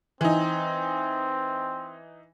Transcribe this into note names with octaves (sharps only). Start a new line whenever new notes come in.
E3 C4 D#4